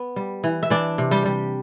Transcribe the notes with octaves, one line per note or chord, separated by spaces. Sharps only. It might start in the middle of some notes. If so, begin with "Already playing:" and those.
Already playing: B3
G3
E3
E5
E3 D4 D5
C3
G3 G4
G3